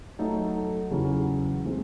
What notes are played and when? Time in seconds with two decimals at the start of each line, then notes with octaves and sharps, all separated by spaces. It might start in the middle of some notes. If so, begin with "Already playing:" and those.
0.19 F#3 A3 D#4 A4
0.90 E2 C#3 F#3
1.65 D#3 G#3 C4